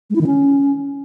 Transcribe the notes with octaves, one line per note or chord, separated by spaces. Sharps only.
G#3
E4
D#3
C#4